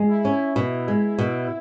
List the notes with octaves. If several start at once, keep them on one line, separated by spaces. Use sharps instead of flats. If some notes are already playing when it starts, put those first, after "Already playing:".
Already playing: G#3
E4
C#4
B2 E4
G#3
B2